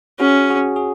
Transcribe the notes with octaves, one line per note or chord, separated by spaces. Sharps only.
C#4 F#4 G#4
F#4 G#4
G#4